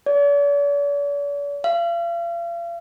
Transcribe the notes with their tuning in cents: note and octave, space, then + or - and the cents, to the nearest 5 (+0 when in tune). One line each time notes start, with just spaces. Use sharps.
D5 -45
F5 -40